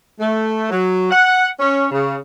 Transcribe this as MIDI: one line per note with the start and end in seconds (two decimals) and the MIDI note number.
0.20 0.68 57
0.70 1.10 54
1.11 1.46 78
1.60 1.86 61
1.92 2.17 49